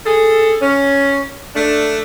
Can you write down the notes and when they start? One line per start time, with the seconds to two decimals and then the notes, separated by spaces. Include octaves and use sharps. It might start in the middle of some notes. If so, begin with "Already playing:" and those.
0.06 G#4 A4
0.61 C#4
1.55 A3 D4